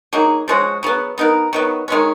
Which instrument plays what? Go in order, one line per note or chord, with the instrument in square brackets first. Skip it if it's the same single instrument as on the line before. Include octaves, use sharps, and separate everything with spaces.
[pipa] F#3 A#3 D#4 G#4
F3 G#3 C#4 F#4
C#3 F#3 B3
B3 D#4 A#4
D#3 F#3 B3
D#3 G#3 C#4